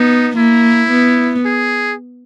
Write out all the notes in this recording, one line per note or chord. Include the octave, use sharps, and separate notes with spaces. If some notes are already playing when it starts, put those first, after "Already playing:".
Already playing: B3 D#4
A#3 E4
B3
G#4